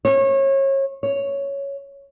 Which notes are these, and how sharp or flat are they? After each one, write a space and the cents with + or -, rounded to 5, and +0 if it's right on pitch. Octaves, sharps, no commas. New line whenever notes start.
C#5 -30
C#5 +5